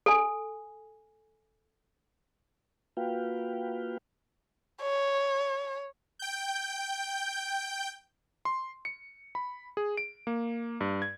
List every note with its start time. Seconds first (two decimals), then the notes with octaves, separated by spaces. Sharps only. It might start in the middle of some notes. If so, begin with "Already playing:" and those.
0.06 A4 G#5
2.97 A#3 F4 F#4 B4 F5 G5
4.82 C#5
6.19 G5 G6
8.45 C6
8.85 C#7
9.35 B5
9.77 G#4
9.97 D7
10.27 A#3
10.81 G2
11.02 G#6